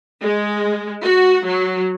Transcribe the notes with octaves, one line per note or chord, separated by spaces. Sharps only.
G#3
F#4
F#3